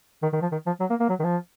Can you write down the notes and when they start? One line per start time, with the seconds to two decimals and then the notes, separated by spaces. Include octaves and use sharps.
0.23 D#3
0.33 D#3
0.42 F3
0.52 D#3
0.66 F3
0.80 F#3
0.90 A#3
1.00 A#3
1.09 F#3
1.19 D#3
1.24 F3